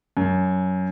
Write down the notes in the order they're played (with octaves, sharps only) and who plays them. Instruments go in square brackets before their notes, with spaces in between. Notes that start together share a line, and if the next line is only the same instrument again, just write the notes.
[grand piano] F#2